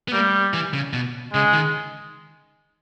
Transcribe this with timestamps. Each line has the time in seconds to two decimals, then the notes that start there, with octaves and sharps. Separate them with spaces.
0.08 B3
0.13 G3 A#3
0.54 E3
0.74 C#3
0.93 B2
1.33 C#3 G#3
1.54 D#3